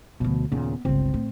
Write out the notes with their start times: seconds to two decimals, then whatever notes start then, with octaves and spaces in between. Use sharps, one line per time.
0.20 D2 B2 F3
0.52 D#2 A#2 C#3 B3
0.85 G1 C#2 C4
1.14 A2